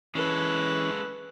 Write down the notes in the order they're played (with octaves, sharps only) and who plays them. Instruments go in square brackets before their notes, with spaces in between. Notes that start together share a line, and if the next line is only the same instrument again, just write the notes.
[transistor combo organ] E3 C#4 [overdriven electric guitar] G#3 A4 [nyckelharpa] B4